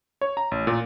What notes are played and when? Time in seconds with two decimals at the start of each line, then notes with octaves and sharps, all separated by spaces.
0.21 C#5
0.37 A#5
0.51 A1
0.67 A#2